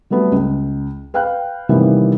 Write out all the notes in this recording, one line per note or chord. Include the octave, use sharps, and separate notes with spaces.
F#3 G3 A3 B3
C#2
B4 F5 G5 F#6
C3 D#3 E3 G3 A#3 B3